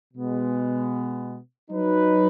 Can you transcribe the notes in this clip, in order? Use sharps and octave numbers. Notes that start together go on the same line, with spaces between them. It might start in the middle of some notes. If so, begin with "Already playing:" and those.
B2 G#3 B3
F#3 D#4 B4